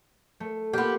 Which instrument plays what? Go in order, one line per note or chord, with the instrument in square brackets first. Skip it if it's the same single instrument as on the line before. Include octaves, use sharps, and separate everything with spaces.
[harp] A3
[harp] A#3 F4 [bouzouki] B3 G4